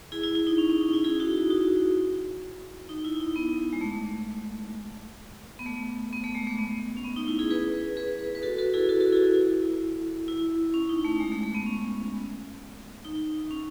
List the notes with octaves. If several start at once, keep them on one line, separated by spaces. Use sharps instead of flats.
E4 G#4
E4
E4
D#4
C#4
C#4
D#4
E4
E4 G#4
D#4 F#4
D#4 F#4
D#4
E4
D#4
B3
G#3
A3
B3
A3
B3
A3
G#3
A3
B3
C#4
B3
D#4
E4
E4 G#4
G#4 B4
G#4 B4
B4
F#4 A4
F#4 A4
E4 G#4
F#4 A4
F#4 A4
E4 G#4
E4
E4
C#4
D#4
A3
G#3
A3
A3
B3
C#4
D#4
C#4